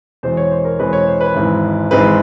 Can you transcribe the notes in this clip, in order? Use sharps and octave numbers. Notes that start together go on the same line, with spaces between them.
E2 B2 G#3 C4 C5
C#5
C5
A#4
E2 B2 G#3 C4 B4
C#5
C5
B4
G#1 G#2 E3 G#3 C4
G#1 G#2 E3 G#3 C4 B4